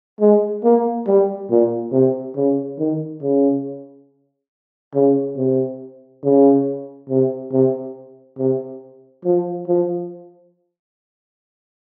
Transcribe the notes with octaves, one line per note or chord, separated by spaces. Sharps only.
G#3
A#3
G3
A#2
C3
C#3
D#3
C#3
C#3
C3
C#3
C3
C3
C3
F3
F3